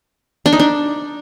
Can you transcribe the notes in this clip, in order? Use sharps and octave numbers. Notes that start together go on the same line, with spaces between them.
D4
D#4
D4